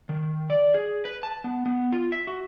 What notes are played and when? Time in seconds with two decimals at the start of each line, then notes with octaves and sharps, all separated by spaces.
0.09 D#3
0.50 D5
0.74 G#4
1.05 B4
1.23 A5
1.44 B3
1.66 B3
1.92 F4
2.12 E5
2.27 F#4